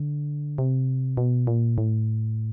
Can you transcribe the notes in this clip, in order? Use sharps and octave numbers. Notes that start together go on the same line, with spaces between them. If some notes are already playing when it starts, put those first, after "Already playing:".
Already playing: D3
C3
B2
A#2
A2